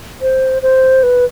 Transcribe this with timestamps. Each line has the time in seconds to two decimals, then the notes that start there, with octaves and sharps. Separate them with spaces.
0.21 C5
0.62 C5
1.03 B4